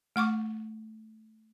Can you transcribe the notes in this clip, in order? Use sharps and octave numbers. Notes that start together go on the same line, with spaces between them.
A3 F#5 C#6 D6